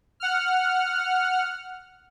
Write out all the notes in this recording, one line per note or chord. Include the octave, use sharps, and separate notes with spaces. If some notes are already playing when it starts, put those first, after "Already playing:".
F#5 F6